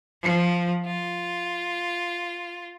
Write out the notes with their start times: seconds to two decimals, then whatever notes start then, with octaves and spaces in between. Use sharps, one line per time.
0.23 F3
0.86 F4